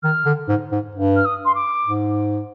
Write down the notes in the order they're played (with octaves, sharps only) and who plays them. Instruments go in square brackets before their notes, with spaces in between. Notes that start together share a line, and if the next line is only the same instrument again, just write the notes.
[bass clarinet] D#3 [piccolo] F6
[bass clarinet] D3
G#2
G#2
G2
[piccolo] F6
D#6
C6
D6
[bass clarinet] G#2